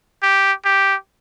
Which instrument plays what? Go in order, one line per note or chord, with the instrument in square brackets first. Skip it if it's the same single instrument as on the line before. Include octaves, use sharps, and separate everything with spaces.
[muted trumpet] G4
G4